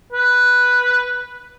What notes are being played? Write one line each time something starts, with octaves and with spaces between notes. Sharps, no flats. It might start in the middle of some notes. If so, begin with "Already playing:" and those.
B4